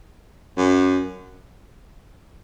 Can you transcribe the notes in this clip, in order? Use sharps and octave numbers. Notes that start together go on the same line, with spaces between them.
F#2